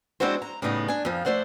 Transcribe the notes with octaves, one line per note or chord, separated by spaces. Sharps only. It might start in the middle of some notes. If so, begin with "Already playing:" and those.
G#3 C4 D4 E4 F#4 C5
A#5
A2 C#3 G3 B3 D#4
D4 G#5
F2 F3
A3 E4 C5 D5 F#5